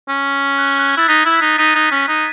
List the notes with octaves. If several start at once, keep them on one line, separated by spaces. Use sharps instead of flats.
C#4
F#6
F#6
G#6
E4 A6
D#4 B6
E4
D#4
D#4 B6 D#7
D#4
C#4
D#4